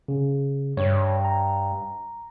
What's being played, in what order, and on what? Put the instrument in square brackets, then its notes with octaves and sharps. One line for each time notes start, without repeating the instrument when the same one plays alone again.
[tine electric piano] C#3
[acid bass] G2 [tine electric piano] C#5
[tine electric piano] A#5